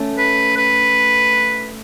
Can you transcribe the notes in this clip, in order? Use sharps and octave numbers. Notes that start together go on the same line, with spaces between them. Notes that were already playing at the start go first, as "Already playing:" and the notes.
Already playing: A3 C#4
B4
B4